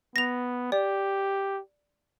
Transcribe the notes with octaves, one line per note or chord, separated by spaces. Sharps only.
B3 A#6 F7
G4 D5